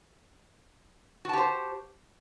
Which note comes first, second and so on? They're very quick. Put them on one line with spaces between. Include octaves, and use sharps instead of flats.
F#4 A5 G4 C5